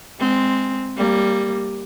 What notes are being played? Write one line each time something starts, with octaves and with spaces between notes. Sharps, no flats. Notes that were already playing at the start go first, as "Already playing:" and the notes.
G#3 C4
G3 A#3